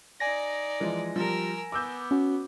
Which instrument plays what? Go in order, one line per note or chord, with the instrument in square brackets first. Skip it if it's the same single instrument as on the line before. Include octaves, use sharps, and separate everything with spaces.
[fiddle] D#4 D5 [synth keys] G#5 A#6
[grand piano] E3 F3 G#3
[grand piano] F3 G3 [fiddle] A#4 E6
[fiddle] B3 [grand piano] D6 E6 G6
[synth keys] C#4 F#4